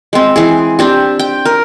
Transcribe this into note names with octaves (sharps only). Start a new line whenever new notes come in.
G#3 C4
E3 G#4
C4 D4 G4
G5
A#4